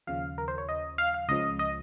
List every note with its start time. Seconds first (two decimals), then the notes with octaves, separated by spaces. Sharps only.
0.07 D#2 C#3 F3 F5
0.38 A#4
0.48 C5
0.58 C#5
0.69 D#5
0.98 F5
1.14 F5
1.29 C#2 C#3 F3 D#5
1.59 D#5